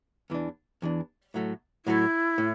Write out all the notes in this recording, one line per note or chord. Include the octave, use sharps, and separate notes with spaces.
E2 E3 D4
E2 E3 D4
A2 F#3 A3
A2 F#3 A3 E4
A2